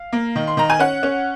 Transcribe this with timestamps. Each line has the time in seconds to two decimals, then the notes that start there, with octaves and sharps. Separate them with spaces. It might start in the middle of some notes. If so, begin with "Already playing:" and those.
Already playing: F5
0.13 A#3
0.36 D#3
0.47 C6
0.57 D#3 A#5
0.70 G#5
0.79 C#4 F#5
1.03 C#4